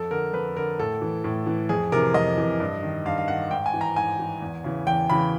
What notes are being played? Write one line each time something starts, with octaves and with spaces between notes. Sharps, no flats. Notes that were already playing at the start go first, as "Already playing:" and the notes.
Already playing: F2 A4
D3 A#4
F2 B4
D3 A#4
A2 A4
E3
A2
E3
F2 G#4
C3 E3 A#4
F2 D#5
C3 E3
G2
D#3
G2 F5
F5
D#3 F#5
G#2 G5
G#5
E3
A#5
G#2 G#5
E3
E2
C#3 E3
E2 G5
C#3 E3 B5